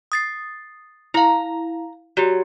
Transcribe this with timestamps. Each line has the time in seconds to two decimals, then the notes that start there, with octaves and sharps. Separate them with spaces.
0.12 D#6 A6 C7
1.14 E4 F5 A#5
2.17 F#3 F#4 G4